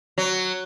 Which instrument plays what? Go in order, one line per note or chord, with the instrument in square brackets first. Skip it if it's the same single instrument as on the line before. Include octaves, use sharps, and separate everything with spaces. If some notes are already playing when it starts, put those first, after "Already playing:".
[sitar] F#3